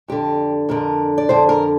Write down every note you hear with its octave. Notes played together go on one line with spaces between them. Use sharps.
F2 D3 G4
F2 D3 A#4
D5
F2 D3 C5
A#4